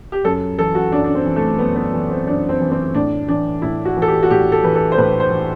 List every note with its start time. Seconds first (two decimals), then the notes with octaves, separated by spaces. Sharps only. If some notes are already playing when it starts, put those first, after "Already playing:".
0.12 G4
0.24 F#2 A4
0.58 E3 A4
0.75 F#4
0.92 F#2 D4
1.04 D4
1.15 C4
1.25 E3
1.36 A3
1.59 F#2 B3
1.76 B3
1.93 E3
2.10 C4
2.26 F#2 D4
2.49 C4
2.60 E3
2.72 C4
2.94 A2 D4
3.28 E3 D4
3.62 A2 E4
3.85 F#4
3.97 E3
4.02 A4
4.07 G4
4.23 F#4
4.30 A2 G4
4.52 A4
4.63 E3 B4
4.75 A4
4.92 C5
4.97 A2 B4
5.20 C5
5.31 E3